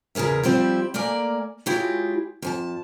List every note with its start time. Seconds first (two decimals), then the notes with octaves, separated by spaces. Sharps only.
0.15 E2 C#3 G#4 A#4 E5
0.43 F3 G3 C4 E4 F4 G4
0.94 A3 A#3 A#4 D5 G#5
1.66 F#3 G#3 E4 F4 G4 G#4
2.42 F2 G#5 A5